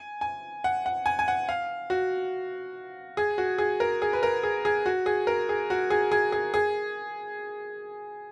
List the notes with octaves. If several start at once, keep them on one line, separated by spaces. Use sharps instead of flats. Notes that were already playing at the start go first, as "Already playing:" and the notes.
Already playing: G#5
G#5
F#5
F#5
G#5
G#5
F#5
F5
F#4
G#4
F#4
G#4
A#4
G#4
B4
A#4
G#4
G#4
F#4
G#4
A#4
G#4
F#4
G#4
G#4
G#4
G#4